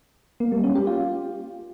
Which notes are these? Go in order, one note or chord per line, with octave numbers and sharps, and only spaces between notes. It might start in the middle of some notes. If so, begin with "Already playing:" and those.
A#3
G3
C#4
G4
F4